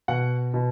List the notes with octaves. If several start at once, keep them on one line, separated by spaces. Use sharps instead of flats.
B2 F#5
B2